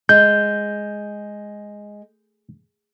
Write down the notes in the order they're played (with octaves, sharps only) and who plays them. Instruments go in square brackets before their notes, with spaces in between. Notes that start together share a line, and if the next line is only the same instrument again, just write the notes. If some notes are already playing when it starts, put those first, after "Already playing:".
[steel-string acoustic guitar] G#3 [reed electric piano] G6